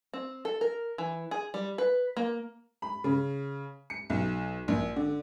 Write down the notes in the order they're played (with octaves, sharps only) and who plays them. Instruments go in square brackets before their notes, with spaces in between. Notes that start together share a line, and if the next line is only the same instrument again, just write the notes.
[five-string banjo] C4
A4
A#4
E3
G#4
G3
B4
A#3
[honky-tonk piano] B5
C#3
C#7
B1
A#1
D3